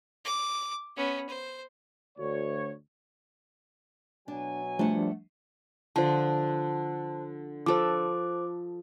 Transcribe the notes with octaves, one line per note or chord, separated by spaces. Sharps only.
D6
B3 C#4
C5
D2 C#5
B2 F#3 D4 G#5
F3 G3 A3 D4 F#5
D3 F3 C5 A5
F3 A4 C5 D6